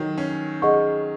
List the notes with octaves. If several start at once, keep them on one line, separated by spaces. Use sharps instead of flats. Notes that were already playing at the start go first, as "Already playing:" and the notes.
Already playing: D#3 F#3 F#4
C#4
G#4 D#5 F#5 C#6